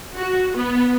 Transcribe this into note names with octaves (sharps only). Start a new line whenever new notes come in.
F#4
B3